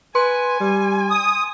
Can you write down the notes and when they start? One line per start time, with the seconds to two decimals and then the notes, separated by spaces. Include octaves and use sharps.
0.15 B4 G#5 C6
0.61 G3
1.10 D#6